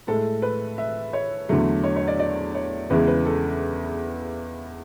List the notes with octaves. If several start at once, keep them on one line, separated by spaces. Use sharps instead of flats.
A2 G#3 A4
B4
E5
C#5
E2 D3 F#3 A3
C#5
C#5
D5
D5
C#5
E2 C#3 E3 G#3 B4
B4
A4